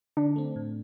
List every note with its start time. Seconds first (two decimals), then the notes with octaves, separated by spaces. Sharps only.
0.17 D3 D4
0.36 A3 C4
0.56 A2